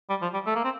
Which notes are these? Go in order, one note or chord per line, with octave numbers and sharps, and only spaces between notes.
G3
F3
G3
A3
A#3
C4